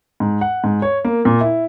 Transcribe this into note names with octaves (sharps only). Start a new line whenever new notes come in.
G#2
F#5
G#2
C#5
A#3
A#2
E4